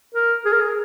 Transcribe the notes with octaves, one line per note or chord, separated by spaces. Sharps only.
A#4
G#4
A#4
G#4